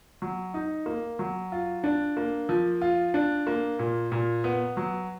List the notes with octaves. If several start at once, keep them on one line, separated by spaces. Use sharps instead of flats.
F#3
D#4
A#3
F#3
F4
D4
A#3
F3
F4
D4
A#3
A#2
A#2
B3
F#3